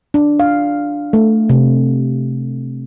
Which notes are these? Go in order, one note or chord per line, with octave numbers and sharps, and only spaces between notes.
D4
F5
A3
C3